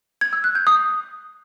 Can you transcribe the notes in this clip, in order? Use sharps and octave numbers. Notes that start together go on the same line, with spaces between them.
G#6
E6
F#6
G6
D#6